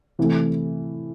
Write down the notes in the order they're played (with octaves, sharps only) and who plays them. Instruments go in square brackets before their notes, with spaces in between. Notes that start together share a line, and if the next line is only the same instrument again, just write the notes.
[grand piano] C3 E3 A3